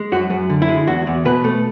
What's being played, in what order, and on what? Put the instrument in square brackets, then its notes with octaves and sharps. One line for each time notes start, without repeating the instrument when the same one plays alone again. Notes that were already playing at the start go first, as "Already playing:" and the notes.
Already playing: [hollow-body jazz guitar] G#3
F#2 F#4
F#2
D3
E4
G#3
E2 F#4
E2
B2 B4
A3